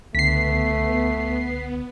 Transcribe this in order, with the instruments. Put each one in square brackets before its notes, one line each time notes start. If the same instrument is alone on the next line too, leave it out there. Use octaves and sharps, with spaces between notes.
[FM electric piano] C#2 D3 [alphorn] A3 [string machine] B3 [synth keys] B6 C7